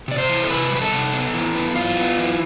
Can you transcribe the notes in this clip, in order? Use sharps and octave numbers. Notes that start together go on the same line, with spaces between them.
C3 D5
C5
E3
A4
C3 B4
G3 B4
A4
C3
B3
E3
B3
E3 F4
B3
E3